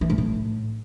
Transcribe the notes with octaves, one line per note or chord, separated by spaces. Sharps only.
E3
G#2
A2